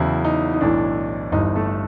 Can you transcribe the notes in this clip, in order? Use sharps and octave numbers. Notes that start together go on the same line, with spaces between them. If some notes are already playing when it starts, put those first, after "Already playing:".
Already playing: E2 C#3 E3 F#3 E4
D#4
D#4
B1 A2 E3 D4
G1 G2 E3 D#4
A3 A4